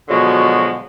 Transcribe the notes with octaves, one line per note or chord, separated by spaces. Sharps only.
B2 D3 F3 F#3 G#3